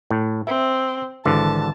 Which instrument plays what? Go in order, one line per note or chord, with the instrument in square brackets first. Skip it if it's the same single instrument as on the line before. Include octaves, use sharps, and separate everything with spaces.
[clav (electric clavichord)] A2
[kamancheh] C4 [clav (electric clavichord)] E5
[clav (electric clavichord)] G#1 D3 E3 [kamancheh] A5